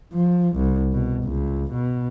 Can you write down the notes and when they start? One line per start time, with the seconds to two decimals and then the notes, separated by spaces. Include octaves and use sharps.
0.13 F3
0.57 C2
0.93 B2
1.24 C#2
1.74 B2